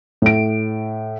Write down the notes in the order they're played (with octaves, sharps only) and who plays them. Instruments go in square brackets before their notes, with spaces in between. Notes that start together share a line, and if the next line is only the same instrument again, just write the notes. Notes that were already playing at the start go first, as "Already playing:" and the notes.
[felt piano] A2 D7